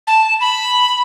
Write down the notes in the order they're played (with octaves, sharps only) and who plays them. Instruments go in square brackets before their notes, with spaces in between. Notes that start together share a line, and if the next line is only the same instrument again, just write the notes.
[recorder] A5
B5